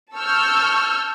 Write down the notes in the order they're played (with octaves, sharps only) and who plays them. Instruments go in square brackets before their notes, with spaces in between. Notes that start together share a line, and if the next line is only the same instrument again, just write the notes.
[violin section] A5 C#6 E6 F6 G6